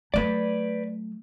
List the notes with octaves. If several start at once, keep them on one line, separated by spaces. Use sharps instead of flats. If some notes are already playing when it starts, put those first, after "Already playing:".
F#3 A3 B4 D5